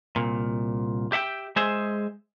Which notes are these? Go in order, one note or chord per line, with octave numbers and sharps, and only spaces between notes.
C2 A#2
G4 E5 F#5 G5
G#3 G#4 C5 E5